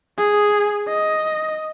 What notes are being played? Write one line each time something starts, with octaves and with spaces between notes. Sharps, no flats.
G#4
D#5